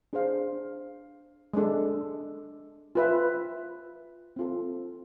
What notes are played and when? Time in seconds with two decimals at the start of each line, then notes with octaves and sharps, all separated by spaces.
0.13 D4 G#4 C5 F5
1.54 G#3 D4 A4
2.95 F4 B4 E5
4.36 C4 F4 A4